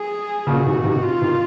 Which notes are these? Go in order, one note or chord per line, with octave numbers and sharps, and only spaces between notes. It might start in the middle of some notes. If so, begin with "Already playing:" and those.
Already playing: G#4
A#2 C#3 F#4
C3 D#3
C3 D#3
F4
C3 D#3